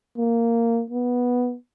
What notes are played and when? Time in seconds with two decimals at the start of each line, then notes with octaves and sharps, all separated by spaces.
0.17 A#3
0.90 B3